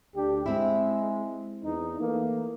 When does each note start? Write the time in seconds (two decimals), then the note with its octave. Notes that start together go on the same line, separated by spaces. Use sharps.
0.14 D2 D4 G4
0.46 G#3 C4 E4
1.63 E2 D#4
2.00 E3 A3 A#3